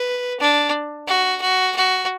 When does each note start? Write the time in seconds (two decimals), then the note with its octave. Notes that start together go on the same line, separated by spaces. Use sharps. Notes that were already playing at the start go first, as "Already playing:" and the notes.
Already playing: B4
0.40 D4
1.07 F#4
1.41 F#4
1.76 F#4